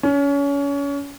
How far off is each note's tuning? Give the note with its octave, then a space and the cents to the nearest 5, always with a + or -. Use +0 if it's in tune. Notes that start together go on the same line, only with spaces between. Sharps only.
C#4 +30